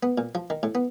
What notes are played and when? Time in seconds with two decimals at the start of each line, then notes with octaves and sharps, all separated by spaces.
0.03 B3
0.18 A#2
0.35 F3
0.50 D#3
0.63 A2
0.75 B3